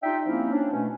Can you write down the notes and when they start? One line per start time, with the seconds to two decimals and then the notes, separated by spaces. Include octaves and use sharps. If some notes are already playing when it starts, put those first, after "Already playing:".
0.03 D4 D#4 F4 G4 E5 G5
0.26 F3 A#3 C4 C#4 D#4 E4
0.52 C#4 D4
0.73 B2 A3 C#4